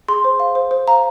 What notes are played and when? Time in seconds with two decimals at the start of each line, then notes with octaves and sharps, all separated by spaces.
0.08 G#4 C6
0.24 C5
0.40 F5
0.55 C5
0.71 C5
0.87 F5 A#5